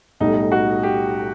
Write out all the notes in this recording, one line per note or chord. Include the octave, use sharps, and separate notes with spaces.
B1 A2 G3 D#4
F#4
G4